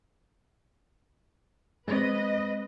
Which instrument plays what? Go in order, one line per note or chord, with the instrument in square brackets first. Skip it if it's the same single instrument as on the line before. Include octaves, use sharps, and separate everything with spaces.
[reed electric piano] G#3 C4 [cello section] B4 D#5